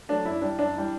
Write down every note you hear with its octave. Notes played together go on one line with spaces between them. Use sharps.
F#3 A3 D4
F#2 E4
E3 G3 D4
F#2 D4
E3 G3